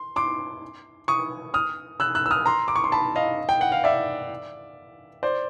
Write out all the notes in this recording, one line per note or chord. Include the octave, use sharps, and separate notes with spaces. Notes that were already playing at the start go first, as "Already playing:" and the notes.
Already playing: C6
C6 D6
C#6 D#6
D#6 F6
E6 F#6
E6 F#6
E6
D#6 F6
A#5 C6
D6
C#6
C6
A5 B5
D#5 F5
G5
F#5
F5
D5 E5
C5 D5